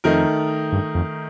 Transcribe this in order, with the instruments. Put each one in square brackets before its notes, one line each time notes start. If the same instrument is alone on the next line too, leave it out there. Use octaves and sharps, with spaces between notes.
[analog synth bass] F2 [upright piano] D#3 A3 D#4 A#4
[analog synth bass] G2
F2